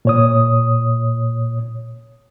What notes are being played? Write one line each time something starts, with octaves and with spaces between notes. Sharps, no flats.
A#2 C#5 D#6